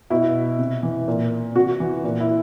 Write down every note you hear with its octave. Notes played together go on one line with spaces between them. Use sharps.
B2 E4
C3
E3
A#2
C3 F#4
E3
A#2
E4